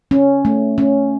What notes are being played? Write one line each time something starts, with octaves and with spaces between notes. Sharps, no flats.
C#4
A3
C#4